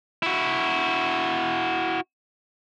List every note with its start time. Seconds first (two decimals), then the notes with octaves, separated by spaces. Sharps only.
0.23 E4 F#4